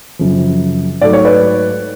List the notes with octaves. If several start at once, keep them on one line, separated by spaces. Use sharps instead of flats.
F#2 C#3 F3
G#2 F#3 A3 D5
C#5
B4 D5